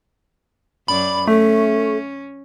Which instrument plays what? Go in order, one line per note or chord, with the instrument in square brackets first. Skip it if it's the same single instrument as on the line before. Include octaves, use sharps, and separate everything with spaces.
[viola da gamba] F#2 D5 [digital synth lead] B5
[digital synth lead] A3 [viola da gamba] C#4 [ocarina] A4